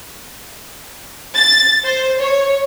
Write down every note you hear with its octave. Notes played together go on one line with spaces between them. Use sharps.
A6
C5
C#5